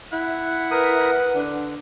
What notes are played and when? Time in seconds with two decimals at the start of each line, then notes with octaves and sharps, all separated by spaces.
0.13 E4 F#5
0.71 A#4 B4 D#6
1.35 D3 D4